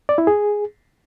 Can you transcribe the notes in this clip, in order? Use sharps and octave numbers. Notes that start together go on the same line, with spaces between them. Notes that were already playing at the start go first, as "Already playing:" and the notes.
D5
E4
G#4